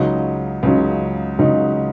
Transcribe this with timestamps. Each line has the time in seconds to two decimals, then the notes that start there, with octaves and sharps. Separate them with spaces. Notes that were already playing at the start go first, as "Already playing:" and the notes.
Already playing: C#2 C#3 F#3 D#4
0.63 C#2 C#3 F#3 D#4
1.38 C#2 C#3 F#3 D#4